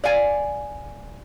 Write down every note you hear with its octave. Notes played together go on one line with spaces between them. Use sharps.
D5 F5 G#5